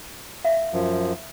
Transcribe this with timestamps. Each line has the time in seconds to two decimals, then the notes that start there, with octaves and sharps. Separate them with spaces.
0.45 E5 F5
0.73 F#2 F3